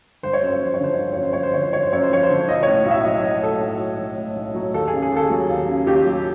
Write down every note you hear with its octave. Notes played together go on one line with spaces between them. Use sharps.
G1 C5
C#5
F#2 C5
C#5
F3 C5
C#5
D3 C5
G1 C#5
C5
F#2 C#5
C5
F3 C#5
C5
D3 C#5
C5
G1 C#5
C5
F#2 C#5
C5
F3 C#5
C5
D3
B1 D#5
A2 C#5
B1
E5
F#3 D#5
B1 D#5
A2 A4
B1
F#3
B1
A2
B1
F#3
D#2 A4
G#4
C#3
G#4
D#2 A4
F#3
D#2
C#3
D#2 G4
F#3